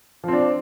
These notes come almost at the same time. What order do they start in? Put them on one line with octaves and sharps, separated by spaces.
F3 C4 D4